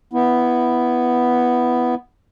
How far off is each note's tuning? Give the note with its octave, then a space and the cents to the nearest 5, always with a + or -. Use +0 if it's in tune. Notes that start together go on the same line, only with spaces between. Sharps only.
B3 +0 E4 +0